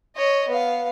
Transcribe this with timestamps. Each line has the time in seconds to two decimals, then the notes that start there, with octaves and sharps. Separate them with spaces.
0.16 C#5 D#5
0.48 B3 F5